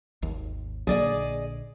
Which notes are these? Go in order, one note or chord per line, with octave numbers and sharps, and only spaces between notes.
G#1 D#2
A#1 D3 A#3 G#4 D5 D#5